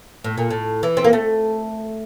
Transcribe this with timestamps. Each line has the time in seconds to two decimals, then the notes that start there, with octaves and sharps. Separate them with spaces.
0.24 A2
0.38 A#2
0.51 A2
0.83 E3
0.97 C4
1.04 A#3
1.13 A3